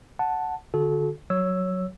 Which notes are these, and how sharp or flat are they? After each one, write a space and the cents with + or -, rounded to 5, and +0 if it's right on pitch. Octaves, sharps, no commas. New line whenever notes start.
F#5 +0 A5 +0
D3 +5 F#4 -20 A4 -30
F#3 +0 C#5 +0 E6 +0